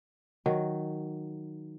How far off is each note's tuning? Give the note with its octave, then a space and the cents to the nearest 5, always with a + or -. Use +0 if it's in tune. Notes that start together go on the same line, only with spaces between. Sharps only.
D#3 +0 F#3 +0